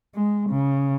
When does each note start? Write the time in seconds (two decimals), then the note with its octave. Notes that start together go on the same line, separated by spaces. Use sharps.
0.15 G#3
0.50 C#3